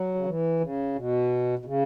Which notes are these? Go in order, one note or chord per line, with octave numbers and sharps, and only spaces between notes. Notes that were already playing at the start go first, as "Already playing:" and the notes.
Already playing: F#3
C#3
E3
C#3
B2
B2
C#3